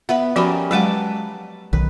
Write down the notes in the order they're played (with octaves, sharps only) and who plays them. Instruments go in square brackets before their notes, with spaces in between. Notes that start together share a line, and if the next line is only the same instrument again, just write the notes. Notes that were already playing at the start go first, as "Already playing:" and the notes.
[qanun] B3 B4 B5 [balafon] E5
[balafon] F3 F#4 B5 [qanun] G3 C#4 A#4
[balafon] F#3 G#3 F#5 [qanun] B4 A5 D6
[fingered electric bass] B1 D#3 [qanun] B4